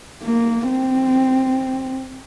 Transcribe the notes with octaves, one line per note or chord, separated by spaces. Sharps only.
A#3
C4